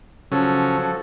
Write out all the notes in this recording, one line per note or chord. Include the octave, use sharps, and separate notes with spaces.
C#3 F3 F#3 C#4 A4
F#3